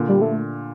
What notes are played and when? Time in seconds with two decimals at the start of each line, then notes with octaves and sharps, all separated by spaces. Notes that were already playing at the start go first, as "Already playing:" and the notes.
Already playing: A#2 D3
0.09 G3
0.21 A3